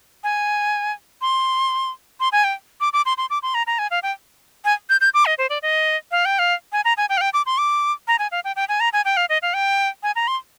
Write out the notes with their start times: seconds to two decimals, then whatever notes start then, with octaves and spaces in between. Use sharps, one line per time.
0.24 G#5
1.22 C6
2.20 C6
2.32 G#5
2.44 G5
2.81 D6
2.93 D6
3.06 C6
3.18 C6
3.30 D6
3.43 C6
3.54 A#5
3.67 A#5
3.79 G#5
3.91 F5
4.03 G5
4.65 G#5
4.90 G6
5.01 G6
5.14 D6
5.26 D#5
5.38 C5
5.50 D5
5.62 D#5
6.11 F5
6.25 G5
6.39 F5
6.72 G#5
6.85 A#5
6.97 G#5
7.09 G5
7.17 F5
7.21 G5
7.34 D6
7.46 C6
7.58 D6
8.08 A#5
8.19 G#5
8.31 F5
8.44 G5
8.56 G5
8.69 G#5
8.80 A#5
8.93 G#5
9.05 G5
9.17 F5
9.29 D#5
9.42 F5
9.54 G5
10.03 G#5
10.16 A#5
10.28 C6